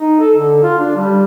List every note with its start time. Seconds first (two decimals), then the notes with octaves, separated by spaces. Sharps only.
0.01 D#4
0.20 A4
0.36 D3
0.63 F4
0.79 D4
0.96 G3